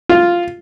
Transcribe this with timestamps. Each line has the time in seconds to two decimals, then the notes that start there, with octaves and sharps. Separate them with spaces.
0.09 F4